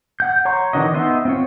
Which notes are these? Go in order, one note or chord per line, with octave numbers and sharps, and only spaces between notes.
F#5 G6
C#5 A#5 C6 C#6
D#3 E3 D4 F#4 D#5
B3 D#4 D#5 E5 C6
C4 F4 C#5